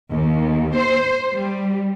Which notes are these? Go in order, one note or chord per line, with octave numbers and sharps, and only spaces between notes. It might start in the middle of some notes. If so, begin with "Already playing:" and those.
D#2
C5
G3